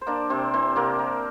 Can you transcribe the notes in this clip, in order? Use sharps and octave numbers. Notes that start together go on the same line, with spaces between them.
C5
A#3 D4 D5
C3 C4 C5
E3 C4 C5
C3 A#3 A#4
A#3